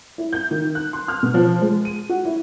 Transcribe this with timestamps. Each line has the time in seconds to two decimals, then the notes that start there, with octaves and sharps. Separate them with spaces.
0.18 E4
0.33 G6
0.51 D#3
0.75 F#6
0.93 C6
1.08 F6
1.23 B2
1.34 F3
1.61 G#3
1.85 D#7
2.09 F#4
2.25 E4